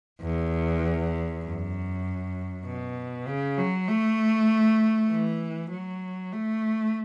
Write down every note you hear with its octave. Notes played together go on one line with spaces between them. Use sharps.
E2
F#2
B2
C#3
F#3
A3
E3
F#3
A3